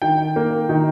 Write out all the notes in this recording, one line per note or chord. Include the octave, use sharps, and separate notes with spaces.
D#3 G5
A#3
D#3